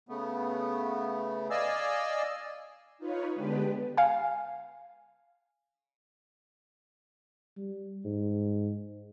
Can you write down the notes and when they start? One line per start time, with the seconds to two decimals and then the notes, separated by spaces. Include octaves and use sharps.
0.09 C#3 A3 B3
1.50 D5 D#5 F5 G#5 E6
2.98 D#4 F4 B4 C#5
3.34 D3 G#3 B3 D4 G4 B4
3.98 F5 G#5
7.56 G3
8.05 G#2